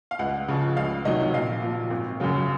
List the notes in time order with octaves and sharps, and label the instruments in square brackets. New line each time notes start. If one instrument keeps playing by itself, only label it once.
[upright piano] F5
C#2 F#5
C#3 F3
C#2 F5
C3 D#3 F#3 D#5
A#1 F5
A#2 F3
G#1
F#2 C#3 F#3